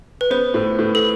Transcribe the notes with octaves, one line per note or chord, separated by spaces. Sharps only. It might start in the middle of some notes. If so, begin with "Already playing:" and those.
B4
B3 C5
A2
A2
A4